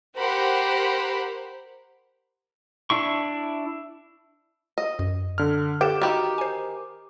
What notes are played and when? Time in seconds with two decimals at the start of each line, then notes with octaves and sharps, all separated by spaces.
0.17 G4 A#4 C5 F#5 B5
2.90 D4 E4 C#6
4.78 D#5
4.99 F#2
5.38 D3 F6
5.81 G4 A4 B4 G5 D6 E7
6.02 D#3 F#4 G4 B5
6.38 C5 G#5